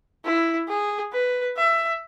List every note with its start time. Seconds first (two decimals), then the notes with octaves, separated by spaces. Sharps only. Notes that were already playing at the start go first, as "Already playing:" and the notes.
0.24 E4
0.68 G#4
1.13 B4
1.57 E5